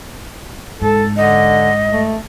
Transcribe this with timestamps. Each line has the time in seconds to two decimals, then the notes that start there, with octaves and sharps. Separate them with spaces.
0.82 G#2 A4
1.16 D3 D#5
1.93 A3